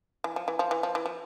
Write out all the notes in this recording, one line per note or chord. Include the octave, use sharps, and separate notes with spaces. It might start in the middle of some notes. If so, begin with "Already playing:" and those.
E3
F3
E3
F3
E3
F3
E3
F3